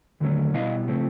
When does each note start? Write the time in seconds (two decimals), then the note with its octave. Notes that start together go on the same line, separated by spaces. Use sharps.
0.20 D#2 D3 F#3 A3 C#4
0.53 B2 G3 B3 E4 D#5 F5
0.88 C#3 F3 A3 C4